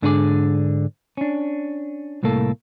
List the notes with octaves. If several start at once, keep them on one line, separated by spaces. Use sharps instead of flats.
G#2 D3 D4 G#4 A#4 D5
C#4 D4
C2 A2 A3 A#3 A4